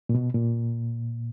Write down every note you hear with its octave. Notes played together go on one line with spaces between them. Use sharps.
A#2
B2
A#2